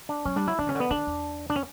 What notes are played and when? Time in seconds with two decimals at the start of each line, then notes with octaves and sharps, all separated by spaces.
0.09 D4
0.25 F#3 C#4
0.36 G3 D4
0.47 F#3 E4
0.58 E3 D4
0.67 C#3 C#4
0.75 D3
0.80 B3
0.90 D3 D4
1.07 E2
1.50 D4
1.56 C#4